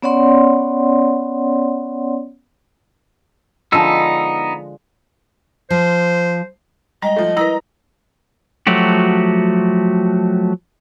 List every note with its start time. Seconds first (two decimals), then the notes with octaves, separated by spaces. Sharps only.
0.03 B3 C#4 C#5 D5 F#5 C6
3.72 D3 F3 G#3 B3 D#4 E6
5.70 F3 C5
7.02 G3 G#3 D#5 A#5
7.16 F3 A3
7.37 E4 A#4 B4 A#5 D#6 A#6
8.67 F3 F#3 A3 F#4 G4